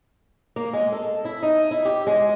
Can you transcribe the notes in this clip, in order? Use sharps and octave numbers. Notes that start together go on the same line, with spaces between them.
A#3
G#3
A4
E4
D#4
E4
G4
G#3